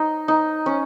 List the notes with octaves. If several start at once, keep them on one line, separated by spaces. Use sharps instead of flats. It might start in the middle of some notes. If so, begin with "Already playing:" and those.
Already playing: D#4
D#4
C#4